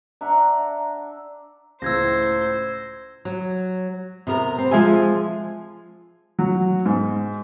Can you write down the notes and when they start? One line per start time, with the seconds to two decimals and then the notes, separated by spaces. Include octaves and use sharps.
0.21 D4 E5 F#5 A#5
1.82 C#2 A2 C5 E6 G#6 A#6
3.25 F#3
4.27 C3 B3 A#4
4.58 C4
4.71 F3 G#3 E5 G#5
6.39 F#3
6.86 G#2